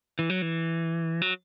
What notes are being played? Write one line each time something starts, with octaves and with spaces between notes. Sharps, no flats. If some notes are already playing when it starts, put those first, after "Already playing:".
E3
F#3
E3
F#3